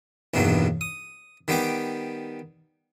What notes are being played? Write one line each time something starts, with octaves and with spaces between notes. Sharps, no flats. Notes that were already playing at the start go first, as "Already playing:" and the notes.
A#1 E2 G2 B2 D#3 F#3
D#6
D#3 G3 B3 G5 D6